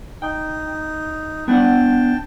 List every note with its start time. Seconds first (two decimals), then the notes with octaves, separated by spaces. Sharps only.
0.22 D#4 G5
1.48 B3 D4 F#5 G5 A5